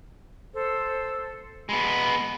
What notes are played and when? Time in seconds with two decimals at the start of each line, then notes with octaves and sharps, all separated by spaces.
0.53 A4 C5
1.69 G#3 B3 B5